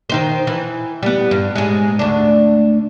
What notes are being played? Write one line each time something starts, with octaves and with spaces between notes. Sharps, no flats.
D#3 D#4 C5
E3
G3 B3
G2
G#2 G#3
D2 D4